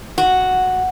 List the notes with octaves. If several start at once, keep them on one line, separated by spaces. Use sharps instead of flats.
F#4